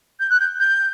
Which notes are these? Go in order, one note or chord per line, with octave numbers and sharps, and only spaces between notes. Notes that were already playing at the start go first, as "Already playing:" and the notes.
G6
F#6
G6
G6